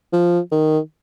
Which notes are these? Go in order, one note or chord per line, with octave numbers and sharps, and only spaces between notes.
F3
D#3